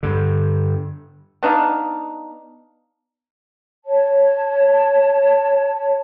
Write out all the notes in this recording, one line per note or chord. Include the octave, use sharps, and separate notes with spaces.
G2 D3
B3 D4 D#4 F5
C#5 A5